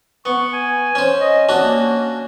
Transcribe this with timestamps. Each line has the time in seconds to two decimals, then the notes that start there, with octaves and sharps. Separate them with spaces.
0.25 B3 C#6
0.52 G#5
0.95 C#4 C5
1.19 D#5
1.49 C#4 D4 F#4
1.61 A#3